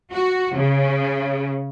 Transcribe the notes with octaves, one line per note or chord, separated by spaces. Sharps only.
F#4
C#3